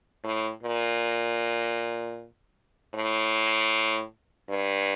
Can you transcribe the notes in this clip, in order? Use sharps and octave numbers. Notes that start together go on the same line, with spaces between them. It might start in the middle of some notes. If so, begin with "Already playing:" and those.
A2
A#2
A2
G2